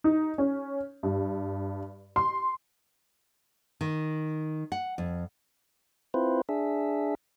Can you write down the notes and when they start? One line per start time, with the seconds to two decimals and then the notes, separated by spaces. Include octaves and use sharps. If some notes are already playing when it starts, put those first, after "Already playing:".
0.04 D#4
0.38 C#4
1.03 G2
2.16 C6
3.81 D#3
4.72 F#5
4.98 F2
6.14 C4 E4 F4 B4 C5
6.49 D4 G#4 E5